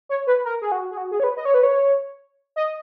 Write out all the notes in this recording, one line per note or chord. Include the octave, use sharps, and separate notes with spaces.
C#5
B4
A#4
G#4
F#4
G#4
F#4
G#4
C#5
B4
D#5
C#5
B4
C#5
D#5